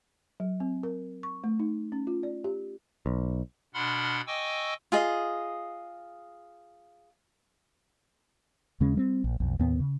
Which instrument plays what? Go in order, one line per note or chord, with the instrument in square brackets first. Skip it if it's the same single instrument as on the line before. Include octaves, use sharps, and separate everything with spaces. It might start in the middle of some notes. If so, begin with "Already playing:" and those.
[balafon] F#3
C4
A#4
C#6
A3
D#4
C#4
F4
D5
G4
[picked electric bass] B1
[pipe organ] B2 D4 F#5 B5 C6 F6
D#5 G5 G#5 C#6 D6 E6
[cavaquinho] F4 G#4 D#5
[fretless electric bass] D#2 C#3 G#3 C#4
G3 A3 C4
A#1
B1 F2
D#2 A2 B3
C#3